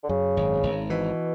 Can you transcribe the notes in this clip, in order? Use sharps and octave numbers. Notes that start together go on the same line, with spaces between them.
D3
F#2 C#3
G#1
G#1
B2 E3